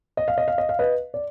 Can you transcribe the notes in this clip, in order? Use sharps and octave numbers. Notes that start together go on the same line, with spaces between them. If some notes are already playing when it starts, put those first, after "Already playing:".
D#5
F5
D#5
F5
D#5
F5
B4 D#5
D5